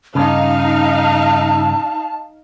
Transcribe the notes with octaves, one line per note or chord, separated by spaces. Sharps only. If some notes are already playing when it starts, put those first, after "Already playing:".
G2 C#3 D#4 F5 A5